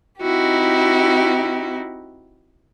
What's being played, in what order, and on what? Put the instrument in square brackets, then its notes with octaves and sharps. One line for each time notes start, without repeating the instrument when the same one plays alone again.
[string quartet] C4 D#4 E4 F#4 G4